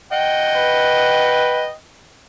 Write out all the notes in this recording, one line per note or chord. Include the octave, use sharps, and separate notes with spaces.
D#5 F#5 G5
B4